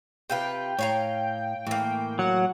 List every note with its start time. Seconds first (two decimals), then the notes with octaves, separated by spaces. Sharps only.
0.30 C3 F4 B4 G5
0.79 A2 C#5 F5 A#5
1.67 A2 E3 A#3
2.19 F#3 F#5